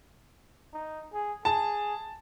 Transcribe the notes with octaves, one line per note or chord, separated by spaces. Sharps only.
D#4
G#4
G#4 A5